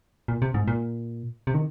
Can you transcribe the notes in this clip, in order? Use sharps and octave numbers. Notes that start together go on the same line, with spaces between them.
A#2
C3
G#2
A#2
C3
D#3